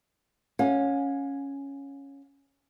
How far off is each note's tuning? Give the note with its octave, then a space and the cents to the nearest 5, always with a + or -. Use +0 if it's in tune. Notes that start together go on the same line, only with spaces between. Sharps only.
C#4 +0 F5 +45